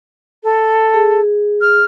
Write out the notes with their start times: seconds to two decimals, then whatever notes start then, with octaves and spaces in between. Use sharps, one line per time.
0.43 A4
0.94 G#4
1.61 F6